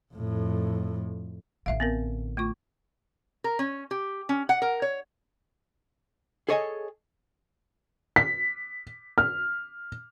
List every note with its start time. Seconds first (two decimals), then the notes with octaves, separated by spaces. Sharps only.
0.14 F2 A2
1.66 A1 D3 E5 F5
1.80 B3 C4 A#4
2.37 A3 F4 C#6
3.44 A#4
3.59 C#4
3.91 G4
4.29 C#4
4.49 F#5
4.62 A#4
4.82 C#5
6.49 G#4 A4 C#5 D#5 E5 G#5
8.16 B6
9.18 F6